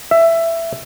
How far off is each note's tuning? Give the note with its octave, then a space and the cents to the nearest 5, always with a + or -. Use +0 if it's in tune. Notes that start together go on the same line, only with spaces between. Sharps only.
E5 +10